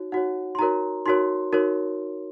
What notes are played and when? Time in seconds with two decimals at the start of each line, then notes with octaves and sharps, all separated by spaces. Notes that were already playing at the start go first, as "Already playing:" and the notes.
Already playing: D#4 F#4 C#5
0.12 D#4 F#4 C#5 F#5
0.55 C6
0.59 D#4 F#4 A#4 C#5 A#5
1.06 D#4 F#4 A#4 C#5 C6
1.53 D#4 F#4 A#4 C#5